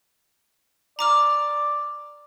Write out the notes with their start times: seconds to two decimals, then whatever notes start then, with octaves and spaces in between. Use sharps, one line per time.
0.99 D5 A#5 D6 F6